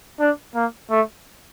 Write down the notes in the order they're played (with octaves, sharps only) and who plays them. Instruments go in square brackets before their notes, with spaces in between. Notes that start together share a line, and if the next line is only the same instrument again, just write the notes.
[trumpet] D4
A#3
A3